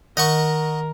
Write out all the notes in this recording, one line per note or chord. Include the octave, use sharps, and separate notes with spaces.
D#3 A#4 D#5 F#5 C#6